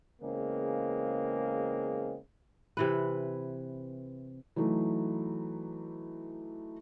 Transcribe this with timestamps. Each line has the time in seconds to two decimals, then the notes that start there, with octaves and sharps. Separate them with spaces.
0.22 E2 C#3 G#3 A#3 C4
2.77 C3 E3 B4
4.56 E3 F#3 A3 D#4